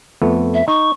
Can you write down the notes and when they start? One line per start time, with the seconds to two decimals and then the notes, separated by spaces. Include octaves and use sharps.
0.22 F2 A3 B3
0.54 E5
0.68 D#4 C#6